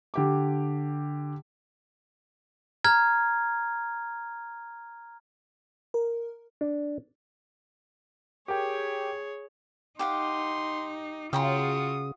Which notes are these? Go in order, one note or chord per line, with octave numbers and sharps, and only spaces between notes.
D3 G4 D6
A#5 F6 G#6
A#4
D4
G4 G#4 A#4 C#5 G5
D#4 G4 F5 F#5 C6
C#3 F4 F#4 G5 A#5 C6 D#6